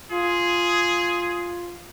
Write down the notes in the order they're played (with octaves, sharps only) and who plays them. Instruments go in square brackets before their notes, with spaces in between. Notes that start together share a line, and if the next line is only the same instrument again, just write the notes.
[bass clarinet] F4 [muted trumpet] G#4